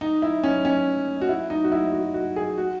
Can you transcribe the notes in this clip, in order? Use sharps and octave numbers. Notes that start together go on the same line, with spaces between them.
D#4
E4
C#4
C#4
F#4
E4
D#4
F#4
E4
F#4
F#4
G#4
F#4